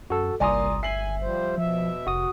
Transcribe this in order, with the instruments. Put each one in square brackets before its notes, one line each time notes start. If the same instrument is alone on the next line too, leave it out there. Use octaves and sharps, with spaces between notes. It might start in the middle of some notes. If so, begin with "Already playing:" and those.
[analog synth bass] F#2 [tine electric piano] F#4 A4
[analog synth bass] G1 [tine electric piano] C2 A#5 D#6 [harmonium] A#3 [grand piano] D5 G#5 C6
[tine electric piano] E5 [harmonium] G#5 [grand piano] C7 F#7
[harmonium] F3 G3 C5
[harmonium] B2 E5 [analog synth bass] F3
[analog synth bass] F1 [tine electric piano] F#4 D#6